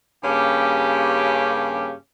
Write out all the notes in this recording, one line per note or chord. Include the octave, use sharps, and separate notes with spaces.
G2 C#3 A#3 C#4 G4